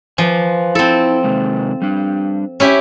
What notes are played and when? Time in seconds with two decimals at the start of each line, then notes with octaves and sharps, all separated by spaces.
0.18 F3 B4 G#5
0.75 C4 E4 A4
1.24 C3 D#3 G#3
1.82 G3 D4
2.60 C#4 E4 G4